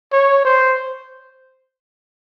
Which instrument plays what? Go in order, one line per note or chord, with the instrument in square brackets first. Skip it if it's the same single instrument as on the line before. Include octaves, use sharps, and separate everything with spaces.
[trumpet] C#5
C5